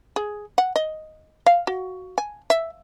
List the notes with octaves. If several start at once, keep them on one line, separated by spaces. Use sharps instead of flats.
G#4
F#5
D#5
F5
F#4
G#5
E5